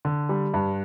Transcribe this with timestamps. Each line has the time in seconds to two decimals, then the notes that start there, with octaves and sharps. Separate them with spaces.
0.05 D3
0.29 G3
0.54 G2